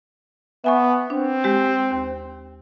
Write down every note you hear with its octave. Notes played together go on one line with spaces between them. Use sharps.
B3 E5 G#5 C#6
C4 D4
G#3 G4
D#2